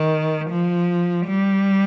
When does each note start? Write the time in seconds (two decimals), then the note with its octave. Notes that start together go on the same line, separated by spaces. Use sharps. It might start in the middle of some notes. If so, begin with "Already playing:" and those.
Already playing: D#3
0.50 F3
1.27 G3